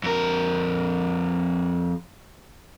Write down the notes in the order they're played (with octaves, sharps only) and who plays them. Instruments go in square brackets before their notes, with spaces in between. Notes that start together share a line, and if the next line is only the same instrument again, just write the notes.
[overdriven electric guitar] F2 A#4